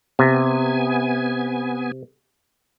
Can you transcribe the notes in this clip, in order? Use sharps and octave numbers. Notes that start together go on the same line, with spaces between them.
C3 B3 G#5